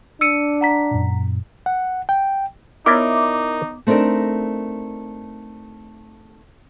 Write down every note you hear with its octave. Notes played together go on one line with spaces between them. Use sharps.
D4 E6 C#7 D#7
F#5 A#5 B6
F#2 A#2
F#5
G5
B3 D#4 E4 A#4 C#5 D5 D6
A3 C4 D4 D#4 A#4